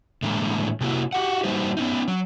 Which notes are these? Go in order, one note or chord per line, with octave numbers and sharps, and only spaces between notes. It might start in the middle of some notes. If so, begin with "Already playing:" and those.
A2 D3 E3 G#3 A#3 A#5
C3 A#3 E4 F#4
F#4 G4 F#5
G3 A#3 D#4 F#4 B4 C5
B3 C#4 D#4
F#3